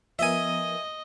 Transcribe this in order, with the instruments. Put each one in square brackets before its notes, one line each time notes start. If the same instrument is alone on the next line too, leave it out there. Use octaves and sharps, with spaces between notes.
[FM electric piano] F3 B3 A#4 [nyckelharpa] D#5 [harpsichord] E5 G#5